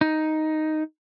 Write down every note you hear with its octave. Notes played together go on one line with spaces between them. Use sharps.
D#4